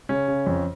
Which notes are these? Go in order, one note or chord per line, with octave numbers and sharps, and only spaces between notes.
C#3 C#4
C#3
F2